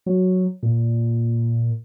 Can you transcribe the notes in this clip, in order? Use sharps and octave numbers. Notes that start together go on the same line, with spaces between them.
F#3
A#2